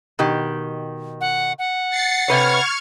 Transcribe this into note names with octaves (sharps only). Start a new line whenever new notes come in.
B2 D#3 G4
F#5
F#5
A6 C7 C#7
C3 B4 C#5 C#6 F6 G#6